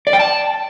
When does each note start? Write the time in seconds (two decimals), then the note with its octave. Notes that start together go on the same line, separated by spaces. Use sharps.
0.07 D5
0.13 G5
0.20 A5